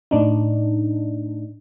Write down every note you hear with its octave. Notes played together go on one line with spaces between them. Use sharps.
A2 D4 D#4